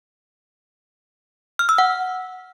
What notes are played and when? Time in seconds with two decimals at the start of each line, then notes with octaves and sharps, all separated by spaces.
1.59 F6
1.69 E6
1.78 F#5